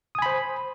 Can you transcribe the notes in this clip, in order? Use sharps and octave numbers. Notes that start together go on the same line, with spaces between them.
C5 G#5 B5 D#6